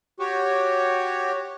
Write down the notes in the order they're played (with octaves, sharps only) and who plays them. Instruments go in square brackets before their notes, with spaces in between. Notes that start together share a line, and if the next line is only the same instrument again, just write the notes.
[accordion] F#4 G4 C#5